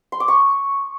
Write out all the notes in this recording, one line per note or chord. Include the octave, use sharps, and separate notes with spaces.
C6
D6
C#6